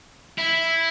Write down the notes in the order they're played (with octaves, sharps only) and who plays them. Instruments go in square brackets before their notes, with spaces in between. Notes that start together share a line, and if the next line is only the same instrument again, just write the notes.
[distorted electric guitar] E4